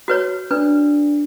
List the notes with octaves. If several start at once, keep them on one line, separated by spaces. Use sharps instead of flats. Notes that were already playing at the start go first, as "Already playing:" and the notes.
F#4 B4 C#5
D4 B4